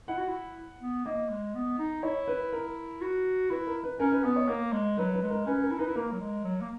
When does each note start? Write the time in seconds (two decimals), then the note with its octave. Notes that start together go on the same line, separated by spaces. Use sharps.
0.08 E4 F#5
0.18 F#4
0.28 E4
0.81 B3
1.06 A#3 D#5
1.30 G#3
1.55 B3
1.79 D#4
2.03 E4 C#5
2.27 B4
2.53 A#4
3.01 F#4
3.50 E4 B4
3.67 A#4
3.83 B4
3.99 C#4 A#4
4.12 B4
4.24 B3 B4
4.36 C#5
4.48 A#3 A#4
4.72 G#3
4.97 F#3 B4
5.14 B4
5.22 G#3
5.31 A#4
5.46 C#4 B4
5.63 A#4
5.71 E4
5.79 D#4 B4
5.87 E4
5.96 A#3 A#4
6.12 F#3
6.20 G#3
6.44 F#3
6.61 A#3